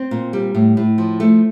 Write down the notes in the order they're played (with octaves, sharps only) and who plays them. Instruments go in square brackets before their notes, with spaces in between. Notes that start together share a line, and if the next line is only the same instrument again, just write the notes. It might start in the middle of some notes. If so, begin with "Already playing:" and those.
Already playing: [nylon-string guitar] C4
A#2
G3
A2
A2
F3
A3